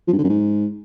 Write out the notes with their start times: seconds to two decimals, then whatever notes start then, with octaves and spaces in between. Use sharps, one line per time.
0.08 F3
0.13 G2
0.18 D3
0.24 F#2
0.29 G#2